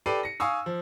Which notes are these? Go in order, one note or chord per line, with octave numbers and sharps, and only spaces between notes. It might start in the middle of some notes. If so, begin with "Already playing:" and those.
G4 A4 B4 D5 C7 D#7
A#6 C#7
F5 G#5 C#6 D#6 E6
F3